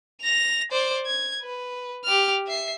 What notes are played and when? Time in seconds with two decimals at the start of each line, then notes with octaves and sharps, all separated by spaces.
0.21 A#6 F7
0.72 C5 D5
1.06 G#6
1.41 B4
2.04 G4 F6
2.47 E5 C7